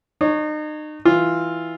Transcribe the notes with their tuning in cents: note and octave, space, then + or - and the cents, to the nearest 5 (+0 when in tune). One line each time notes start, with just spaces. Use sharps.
D#4 -35 C#5 +0
E3 -5 F4 +0